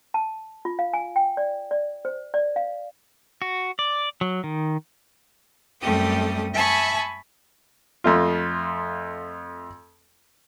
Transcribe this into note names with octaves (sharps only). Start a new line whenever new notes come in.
A5
F4
F5
G#5
G5
D5
D5
C5
D5
F5
F#4
D5
F#3
D#3
F#2 G3 A3 C4 G4 D#6
E5 G#5 A5 B5 C#6 D#6
F2 A3 F4